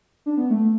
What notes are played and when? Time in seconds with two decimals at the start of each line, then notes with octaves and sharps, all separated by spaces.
0.26 D4
0.37 B3
0.50 A3